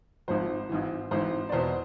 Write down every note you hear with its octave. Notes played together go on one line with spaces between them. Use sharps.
G#1 G#2 F3 C5
G#1 G#2 E3
G#1 G#2 E3 C5
D5
E2 B2 C5